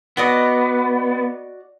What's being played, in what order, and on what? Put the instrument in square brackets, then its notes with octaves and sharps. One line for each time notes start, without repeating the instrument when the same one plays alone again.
[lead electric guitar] B3 [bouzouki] F#4 D5 D#5